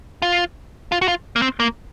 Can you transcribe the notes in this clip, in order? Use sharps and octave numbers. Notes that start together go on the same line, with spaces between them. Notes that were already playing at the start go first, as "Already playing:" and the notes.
F4
F4
F#4
F4
A#3
C4
A#3